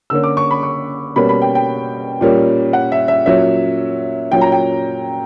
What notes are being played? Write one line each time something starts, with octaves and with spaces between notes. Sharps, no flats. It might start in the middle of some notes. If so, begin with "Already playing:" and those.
D3 A#3 C#4 E6
D6
C#6
B5
C#6
B2 G3 A#3 C#4 B5
B5
G5
G5
A#2 G3 A#3 C#4
F#5
E5
E5
A#2 F#3 C#4 E5
A#2 F#3 C#4 G5
A#5
G5